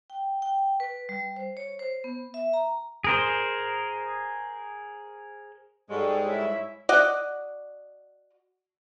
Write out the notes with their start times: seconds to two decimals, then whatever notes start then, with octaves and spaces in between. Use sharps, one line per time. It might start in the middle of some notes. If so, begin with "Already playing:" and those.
0.10 G5
0.42 G5
0.80 B4
1.09 G3
1.36 C5
1.57 C#5
1.79 C5
2.04 B3
2.34 E5
2.53 A#5
3.04 G#4 A#4 C5
5.90 G#2 G3 G#3 G4 A4 C#5
6.26 E4 C#5 E5
6.89 F#4 D5 D#5 F#5